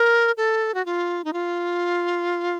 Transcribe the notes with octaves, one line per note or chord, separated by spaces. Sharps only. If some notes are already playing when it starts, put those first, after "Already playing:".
Already playing: A#4
A4
F#4
F4
D#4
F4